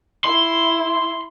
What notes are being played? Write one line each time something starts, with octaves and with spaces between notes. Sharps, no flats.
E4 C6